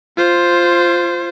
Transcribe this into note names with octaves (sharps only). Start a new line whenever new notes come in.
F4 C5